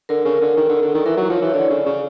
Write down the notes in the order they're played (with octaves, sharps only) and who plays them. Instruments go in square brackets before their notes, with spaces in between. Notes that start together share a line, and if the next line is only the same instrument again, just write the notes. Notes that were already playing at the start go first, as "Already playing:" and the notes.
[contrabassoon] D3 [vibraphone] A#4
[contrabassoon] C#3
D3
D#3
D3
D3
[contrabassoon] D#3 [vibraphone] A4
[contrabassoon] E3 [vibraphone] A#4
[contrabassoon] F#3
[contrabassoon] F3 [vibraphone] C#5
[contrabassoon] E3
[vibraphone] C#5
[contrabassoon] D3 [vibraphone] D5
[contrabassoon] C#3
C#3